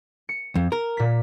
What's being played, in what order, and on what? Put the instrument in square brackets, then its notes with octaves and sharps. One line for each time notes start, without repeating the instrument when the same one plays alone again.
[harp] C#7
[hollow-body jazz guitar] F2
A#4
[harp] A#2 B6